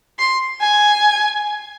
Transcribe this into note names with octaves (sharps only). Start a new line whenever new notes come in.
C6
G#5